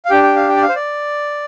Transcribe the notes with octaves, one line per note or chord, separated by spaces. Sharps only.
F5
D4 G4 G5
G5
F5
G5
D5
F5
C5
D5